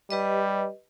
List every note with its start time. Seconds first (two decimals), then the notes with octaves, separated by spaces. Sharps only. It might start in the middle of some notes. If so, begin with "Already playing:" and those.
0.10 G3 G4 B4 D#5